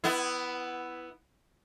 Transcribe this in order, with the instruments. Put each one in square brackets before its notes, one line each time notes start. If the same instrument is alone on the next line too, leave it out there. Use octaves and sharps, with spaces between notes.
[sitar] B3 E4